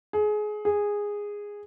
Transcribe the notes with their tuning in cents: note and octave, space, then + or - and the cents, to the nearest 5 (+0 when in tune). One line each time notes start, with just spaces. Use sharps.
G#4 +25
G#4 -10